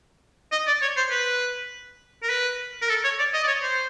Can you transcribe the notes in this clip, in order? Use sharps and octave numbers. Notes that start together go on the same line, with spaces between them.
D#5
D5
C#5
C5
B4
A#4
B4
A#4
A4
C#5
D5
D#5
D5
C#5
C5